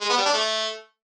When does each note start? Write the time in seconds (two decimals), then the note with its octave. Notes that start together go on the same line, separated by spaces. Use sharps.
0.01 G#3
0.09 B3
0.17 G3
0.26 D4
0.34 A3